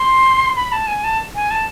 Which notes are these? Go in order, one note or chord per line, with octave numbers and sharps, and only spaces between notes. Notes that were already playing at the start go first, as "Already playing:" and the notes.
Already playing: C6
B5
A5
G#5
A5
G#5
A5